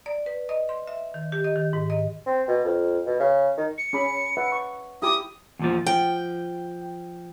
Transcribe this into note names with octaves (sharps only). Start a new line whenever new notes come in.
D5
B4
D#5
C6
E5
D#3
G4
D#5
D#3
G#2
D#5
C4
B2
F2
B2
C#3
D#3
C#7
C#4 G#4 B5
B4 E5 F#5
C#6
E4 G4 D6 D#6
E2 A#2 F3
F3 G5